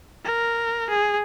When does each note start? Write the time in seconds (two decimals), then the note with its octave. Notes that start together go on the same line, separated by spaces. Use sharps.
0.25 A#4
0.89 G#4